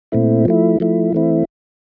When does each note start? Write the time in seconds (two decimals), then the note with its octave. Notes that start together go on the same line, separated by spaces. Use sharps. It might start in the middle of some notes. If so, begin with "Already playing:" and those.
0.12 A#2 A3 C4 E4
0.45 F3 A3 E4
0.80 F3 A3 E4
1.12 E3 A3 C4 E4